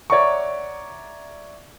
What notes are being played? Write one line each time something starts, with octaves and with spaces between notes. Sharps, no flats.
C#5 D5 E5 F#5 A#5 C#6